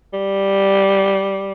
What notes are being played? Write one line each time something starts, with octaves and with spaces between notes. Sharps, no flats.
G3